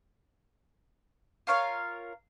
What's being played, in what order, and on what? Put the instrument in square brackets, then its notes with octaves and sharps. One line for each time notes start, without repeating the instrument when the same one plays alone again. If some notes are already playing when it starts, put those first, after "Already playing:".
[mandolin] F4 A#4 C#5 F5